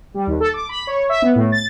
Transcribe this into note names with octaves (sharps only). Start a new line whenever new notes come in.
G3
D#2
A4
D6
B5
C#5
E5
B3
A2
A6